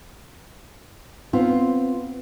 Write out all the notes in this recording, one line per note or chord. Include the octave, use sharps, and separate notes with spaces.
B3 C4 F4